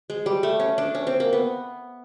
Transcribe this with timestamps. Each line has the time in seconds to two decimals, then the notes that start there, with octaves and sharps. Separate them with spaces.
0.10 G#3
0.26 G3
0.43 A3
0.60 C#4
0.78 D4
0.95 C#4
1.07 C4
1.20 A#3
1.33 B3